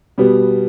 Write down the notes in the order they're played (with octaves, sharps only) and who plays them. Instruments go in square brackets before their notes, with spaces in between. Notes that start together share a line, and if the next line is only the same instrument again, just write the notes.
[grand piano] B2 G3 B3